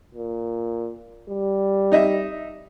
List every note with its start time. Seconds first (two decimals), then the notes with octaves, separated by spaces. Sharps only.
0.15 A#2
1.30 G3
1.92 D#4 D#5 E5